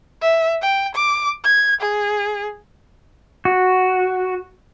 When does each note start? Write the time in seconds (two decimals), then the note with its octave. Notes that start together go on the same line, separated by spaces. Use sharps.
0.21 E5
0.62 G5
0.95 D6
1.44 G#6
1.81 G#4
3.45 F#4